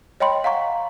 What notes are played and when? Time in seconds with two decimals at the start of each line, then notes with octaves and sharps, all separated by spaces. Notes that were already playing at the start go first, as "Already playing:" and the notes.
0.20 C#5 D#5 G5 B5 C6
0.44 F5 F#5 A#5 C#6